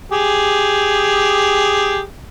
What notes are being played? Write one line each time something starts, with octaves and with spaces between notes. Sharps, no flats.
G4 G#4